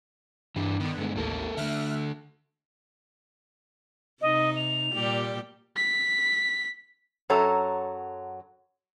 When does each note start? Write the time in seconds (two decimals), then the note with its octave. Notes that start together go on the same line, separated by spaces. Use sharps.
0.56 G2 E3 D4
0.80 D3 D#3 B3
0.98 G2 G#3
1.16 A1 D#2 A#3 A4 A#4
1.57 D3 A3 E5 F6 F#6
4.22 C3 D#4 D#5
4.56 F7
4.93 A#2 G3 G4
5.76 B6
7.30 F#2 F#3 A4 C#5 A#5